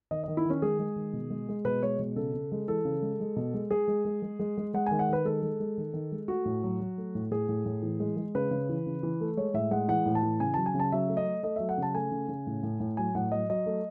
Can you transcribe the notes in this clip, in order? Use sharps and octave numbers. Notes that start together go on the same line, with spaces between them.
D#3 D#5
D#3 D#5
E4
D#3 C#4
G#3 G#4
G#3
D#3
B2
G#3
G#3
B2 B4
G#3 C#5
B2
C#3 A4
C#3
G#3
E3 A4
C#3
G#3
G#3
B2
G#3
G#3 G#4
G#3
G#3
G#3
G#3
G#3
G#3 F#5
D#3 G#5
F#5
D#3 B4
G#3 A4
G#3
G#3
D#3
D#3
G#3
A3 F#4
A2
F#3
F#3
A3
A2
A2 G#4
A2
A2
E3
G#3
G#3
C#3 B4
C#3
E3
C#3
E3
A3
G#3 C#5
A2 E5
G#3 F#5
E3 F#5
A2
A5
E3
C#3 G#5
F#3 A5
G#5
C#3
A5
F#3 E5
A3
D#5
A3
A3 D#5
F#3 E5
F#5
C#3 A5
A3 G#5
C#3
C#3
A2
A2
A2
F#3 G#5
A2 F#5
F#3 D#5
F#3 D#5
A3